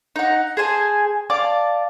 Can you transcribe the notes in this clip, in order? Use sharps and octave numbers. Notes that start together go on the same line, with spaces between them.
D#4 F#5
G#4 C5 G#5 A5
D5 F5 A5 D6